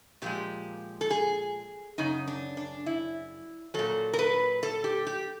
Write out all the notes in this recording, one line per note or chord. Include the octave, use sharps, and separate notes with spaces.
A#2 F3 G#3 G4
A4
G#4
F#2 C#3 D#4
D4
D4
E4
A#2 F#3 A4
A#4
B4
A4
G4
G4